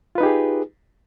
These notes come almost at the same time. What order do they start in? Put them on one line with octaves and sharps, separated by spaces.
F4 B4 D#4 G4 G#4